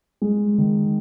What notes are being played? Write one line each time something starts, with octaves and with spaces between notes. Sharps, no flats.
G#3
D#3